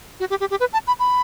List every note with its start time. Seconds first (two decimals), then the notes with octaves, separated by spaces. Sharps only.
0.20 F#4
0.30 G4
0.40 G4
0.51 G4
0.60 B4
0.73 A5
0.87 B5
0.99 B5